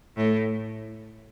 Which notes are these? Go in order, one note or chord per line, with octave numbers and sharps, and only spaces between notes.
A2